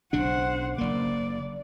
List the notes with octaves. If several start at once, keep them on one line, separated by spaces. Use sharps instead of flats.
B1 C#3 D4 C5 F#5
F#1 A#3 D5